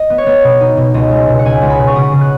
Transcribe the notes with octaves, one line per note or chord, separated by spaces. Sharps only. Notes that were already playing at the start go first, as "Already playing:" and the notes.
Already playing: D#5
B3
C#5
B3
B2
D#4
B2
C#2 D#5
G#3
B2
F#5
C#2 G#5
C#2
B5
B2
C#6
C#3 D#6
C#3
F#6